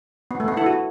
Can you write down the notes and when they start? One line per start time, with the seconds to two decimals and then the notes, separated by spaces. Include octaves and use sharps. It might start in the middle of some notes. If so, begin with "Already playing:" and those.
0.31 B3
0.40 A3
0.48 B3
0.57 E4 A4
0.66 F#4